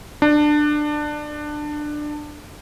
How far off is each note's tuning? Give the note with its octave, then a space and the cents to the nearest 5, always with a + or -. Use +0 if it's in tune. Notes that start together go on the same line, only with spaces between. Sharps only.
D4 +20